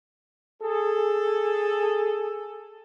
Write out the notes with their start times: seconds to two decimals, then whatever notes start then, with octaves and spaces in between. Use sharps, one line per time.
0.63 G#4 A4